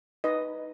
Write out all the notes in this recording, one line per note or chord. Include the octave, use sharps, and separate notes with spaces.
D#4 B4 D#5